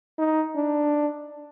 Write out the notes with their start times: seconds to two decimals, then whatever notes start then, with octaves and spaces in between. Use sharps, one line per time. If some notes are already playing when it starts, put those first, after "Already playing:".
0.19 D#4
0.56 D4